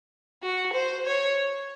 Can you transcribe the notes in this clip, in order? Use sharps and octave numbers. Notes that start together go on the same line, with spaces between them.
F#4
C5
C#5